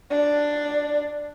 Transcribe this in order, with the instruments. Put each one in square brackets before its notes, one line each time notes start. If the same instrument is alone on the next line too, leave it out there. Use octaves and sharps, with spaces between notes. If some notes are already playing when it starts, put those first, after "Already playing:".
[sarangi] D4